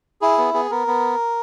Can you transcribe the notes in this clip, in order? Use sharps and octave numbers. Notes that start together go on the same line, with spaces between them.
E4 G#4
B3
B3 G#4
B3 A#4
B3